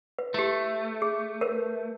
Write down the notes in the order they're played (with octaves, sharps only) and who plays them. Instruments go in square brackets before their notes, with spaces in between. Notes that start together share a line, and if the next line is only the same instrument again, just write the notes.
[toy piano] B4
[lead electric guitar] A3 [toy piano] E4 G4
[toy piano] G#4
A#4 B4